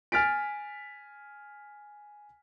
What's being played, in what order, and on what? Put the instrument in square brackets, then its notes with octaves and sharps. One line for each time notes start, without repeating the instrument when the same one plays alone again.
[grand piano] G#5 F6 A6 B6 D7